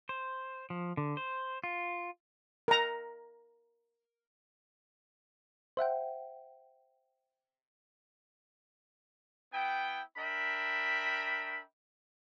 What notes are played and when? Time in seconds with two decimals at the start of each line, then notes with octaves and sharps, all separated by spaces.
0.09 C5
0.70 F3
0.97 D3
1.17 C5
1.64 F4
2.68 A#4 A#5
5.77 C5 E5 F#5 G5
9.53 B3 E4 G5
10.18 D4 A#4 E5 G5 B5